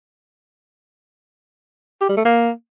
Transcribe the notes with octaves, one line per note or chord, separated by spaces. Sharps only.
G4
G3
A3
A#3